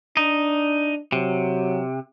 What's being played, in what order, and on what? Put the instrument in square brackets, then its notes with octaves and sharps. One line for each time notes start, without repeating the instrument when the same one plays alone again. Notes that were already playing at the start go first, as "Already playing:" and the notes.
[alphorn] D4 [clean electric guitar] D#4
[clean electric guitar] C3 [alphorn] F#3